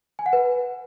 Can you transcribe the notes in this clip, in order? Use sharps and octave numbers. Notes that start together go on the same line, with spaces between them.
G#5
F#5
B4